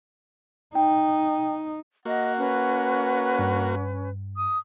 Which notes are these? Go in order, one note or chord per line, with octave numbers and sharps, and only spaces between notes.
D#4 G5
A#3 F#4 D#5 F#5
C#4 B4
G2
D#6